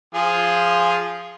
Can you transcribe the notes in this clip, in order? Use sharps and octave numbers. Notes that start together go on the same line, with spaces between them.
F3 F4 G#4